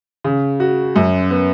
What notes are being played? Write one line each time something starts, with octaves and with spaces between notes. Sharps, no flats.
C#3
F#4
F#2
B3